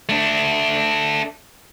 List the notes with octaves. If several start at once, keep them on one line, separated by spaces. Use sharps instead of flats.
A3 D4